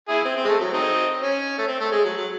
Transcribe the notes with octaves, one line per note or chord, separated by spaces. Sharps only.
E4 G#4
C4
C4
G#3
A3
F#3
C4 D#4
C#4
A3
C4
A3
G#3
F#3
F#3